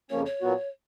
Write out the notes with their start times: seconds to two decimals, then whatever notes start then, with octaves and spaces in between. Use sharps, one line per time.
0.10 F2 C#3 F3 A#3 C#4 C#5
0.26 C#5
0.42 A#2 F#3 B3 F#4